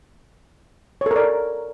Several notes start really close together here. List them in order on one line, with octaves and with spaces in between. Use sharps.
C#5 A4 A#4 D5